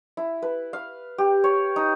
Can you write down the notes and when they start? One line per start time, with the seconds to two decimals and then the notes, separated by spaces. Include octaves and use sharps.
0.17 E4
0.42 B4
0.73 F5
1.18 G4
1.44 C#5
1.76 D#4